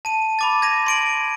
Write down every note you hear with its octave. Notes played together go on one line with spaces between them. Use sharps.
A5 D#7
B5 D6 A6
G#6 A#6 D#7
C6 D7 F#7